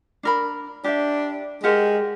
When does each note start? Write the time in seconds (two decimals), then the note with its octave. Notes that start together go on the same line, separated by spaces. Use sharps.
0.23 D4 A#4 B5
0.84 D4 G4 E5
1.64 G#3 G4 A#4 F#5